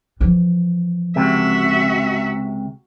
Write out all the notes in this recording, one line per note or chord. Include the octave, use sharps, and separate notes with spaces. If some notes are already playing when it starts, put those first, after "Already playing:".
E3 F3
C#2 C3 F#4 E5